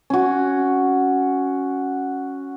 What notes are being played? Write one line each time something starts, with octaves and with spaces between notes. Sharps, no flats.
C#4 F#4